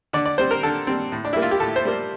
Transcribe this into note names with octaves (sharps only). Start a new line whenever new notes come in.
D3 D5
D5
G3 C4 C5
A#4
D3 A4
G3 C4
A2
D4
G3 A#3 E4
F4
G4
A2 A4
C5
G3 A#3